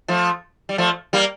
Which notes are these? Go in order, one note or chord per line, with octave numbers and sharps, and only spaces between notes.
F3 A3
G3
F3 A3
G3 A#3